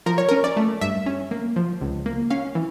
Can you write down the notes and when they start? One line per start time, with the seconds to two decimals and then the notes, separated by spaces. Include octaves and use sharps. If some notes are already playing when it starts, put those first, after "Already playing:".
0.06 F3 A#4
0.18 C#5
0.29 A#4
0.31 C#4
0.44 D5
0.57 A3
0.81 G2 E5
1.06 C#4
1.31 A#3
1.56 F3
1.81 C#2
2.06 A#3
2.30 C#4 F5
2.55 E3